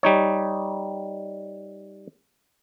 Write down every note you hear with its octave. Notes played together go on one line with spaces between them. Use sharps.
G3 D#4 C#5